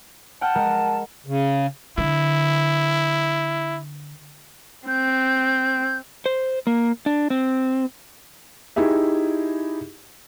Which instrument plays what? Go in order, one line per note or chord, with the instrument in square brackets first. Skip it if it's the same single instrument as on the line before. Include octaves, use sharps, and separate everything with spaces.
[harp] F#5 G5 F6 [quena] A5
[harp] G#3 A#4 A#5
[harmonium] C#3
[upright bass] D3 [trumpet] E4
[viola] C4 [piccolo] G6
[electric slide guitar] C5
A#3
D4
C4
[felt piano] D#4 E4 G4 G#4 E5